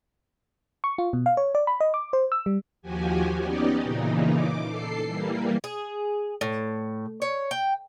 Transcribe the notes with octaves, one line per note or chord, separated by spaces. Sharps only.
C#6
F4
B2
F5
C#5
D5
B5
D#5
D6
C5
E6
G3
D#2 F3 F#4 G4 G#5
B3 C#4 D#4 G4 D5 D#5
A#2 C#3 E3 D#4
D6
A4 C7
E3 G3 A#3
G#4
A2
C#5
G5